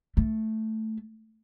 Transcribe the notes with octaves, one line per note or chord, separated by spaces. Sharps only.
A3